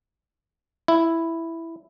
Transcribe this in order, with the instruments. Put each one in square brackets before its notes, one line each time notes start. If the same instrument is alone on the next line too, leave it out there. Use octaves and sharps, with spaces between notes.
[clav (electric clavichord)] E4